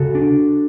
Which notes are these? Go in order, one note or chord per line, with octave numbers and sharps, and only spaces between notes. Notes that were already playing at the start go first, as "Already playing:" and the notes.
Already playing: C#3 F#4 A4
D4